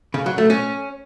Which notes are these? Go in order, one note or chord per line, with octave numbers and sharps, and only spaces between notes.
C#3
F#3
A3
C#4